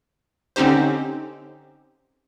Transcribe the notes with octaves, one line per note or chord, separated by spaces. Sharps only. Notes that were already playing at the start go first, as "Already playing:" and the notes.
D3 C4 C#4 D#4 G4 C5